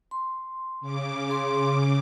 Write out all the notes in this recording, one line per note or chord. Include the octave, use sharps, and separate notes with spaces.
C6
C#3 D6
G#4 C6